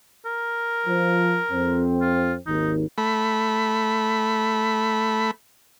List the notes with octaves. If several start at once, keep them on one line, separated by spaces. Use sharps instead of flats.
A#4
F3
F2 C4
F4
G#1 D#2 D#3 D#4
A3 B5